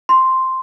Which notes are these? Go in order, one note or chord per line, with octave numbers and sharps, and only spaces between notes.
C6